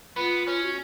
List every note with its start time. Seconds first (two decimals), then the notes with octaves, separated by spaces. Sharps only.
0.16 B3 F4
0.48 C#4
0.63 F#4